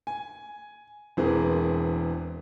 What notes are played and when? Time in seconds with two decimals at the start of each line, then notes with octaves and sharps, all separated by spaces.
0.07 G#5
1.17 E1 E3 C4 G#4 A#4